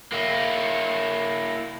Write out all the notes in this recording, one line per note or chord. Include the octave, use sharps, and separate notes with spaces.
A#3 E4